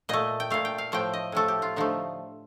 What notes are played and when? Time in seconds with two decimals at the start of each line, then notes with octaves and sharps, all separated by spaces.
0.09 A#2 A3 D#5
0.40 G5
0.50 A#2 A3 F5
0.65 G5
0.78 F5
0.92 A2 F3 A3 G5
1.14 D#5
1.32 A2 F3 A3 A4
1.48 G4
1.62 F4
1.76 D3 F3 A3 D#4